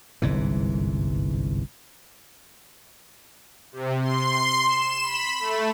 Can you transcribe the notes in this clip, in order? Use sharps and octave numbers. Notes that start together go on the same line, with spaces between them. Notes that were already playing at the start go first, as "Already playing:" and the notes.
G1 C2 G#2 E3
C3
C6
E7
B5
A3